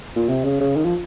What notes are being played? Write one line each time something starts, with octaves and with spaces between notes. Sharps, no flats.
A#2
C3
C#3
C#3
D#3
F3